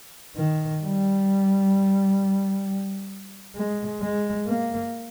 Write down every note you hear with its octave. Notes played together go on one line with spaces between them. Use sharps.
D#3
G3
G#3
G#3
A#3